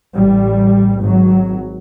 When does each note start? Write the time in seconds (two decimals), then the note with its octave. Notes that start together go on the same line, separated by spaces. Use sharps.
0.14 A1 G3
1.00 G#1 F#3